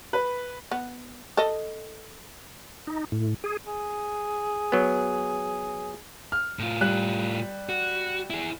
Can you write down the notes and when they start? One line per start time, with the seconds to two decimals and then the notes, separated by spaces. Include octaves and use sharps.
0.13 B4
0.71 B3
1.37 A4 D#5
2.87 D#4
3.12 A2
3.44 G#4
3.67 G#4
4.72 F#3 B3
6.32 F6
6.59 A2 F4
6.81 G3 F#6
7.69 F#4
8.30 E4 G#4